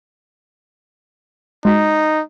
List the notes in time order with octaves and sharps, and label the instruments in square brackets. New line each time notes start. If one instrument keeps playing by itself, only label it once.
[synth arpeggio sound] G#3 F#4 B6 [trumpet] D#4